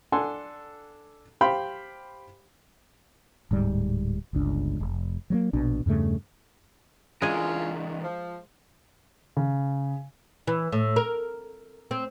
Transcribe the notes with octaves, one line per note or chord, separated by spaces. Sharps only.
D4 A4 F#5 G#5 C6
G4 C5 F5 G5 B5 C6
D1 G#2 G3
G1 C#2 D4
F1
F#3 G3 A#3
A#1 B2 D4
E2 G2 C#3 A3
E3 G#3 C#4 D4 F4 G#4 A#4
F3
C#3
E3
A2
A#4
C4